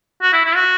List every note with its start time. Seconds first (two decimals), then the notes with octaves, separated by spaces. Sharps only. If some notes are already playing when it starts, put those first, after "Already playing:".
0.22 F#4
0.33 E4
0.45 E4
0.55 F#4